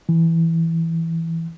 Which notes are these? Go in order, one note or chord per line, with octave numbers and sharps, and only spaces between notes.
E3